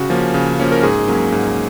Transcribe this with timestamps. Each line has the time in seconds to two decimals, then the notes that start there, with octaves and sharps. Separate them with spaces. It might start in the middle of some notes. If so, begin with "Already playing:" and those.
Already playing: C#3 F#4
0.10 F3 A#3 C#4
0.34 C#3
0.59 F3 A#3 C#4
0.72 A#4
0.83 G#2 G#4
1.08 F#3 A#3 C#4
1.32 G#2